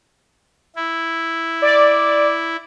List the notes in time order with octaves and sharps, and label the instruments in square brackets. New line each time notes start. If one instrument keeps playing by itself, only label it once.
[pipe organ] E4
[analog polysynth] D5